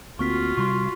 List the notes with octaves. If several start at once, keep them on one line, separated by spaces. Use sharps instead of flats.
D2 A#3 C4 F4 F#4 C#6 F6 B6
C3 G3 C6 C#6